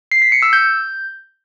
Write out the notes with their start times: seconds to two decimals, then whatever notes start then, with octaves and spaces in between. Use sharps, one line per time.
0.12 C7
0.22 B6
0.32 C#7
0.42 E6
0.53 G6